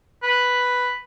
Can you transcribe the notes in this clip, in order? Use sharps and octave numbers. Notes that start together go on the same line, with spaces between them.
B4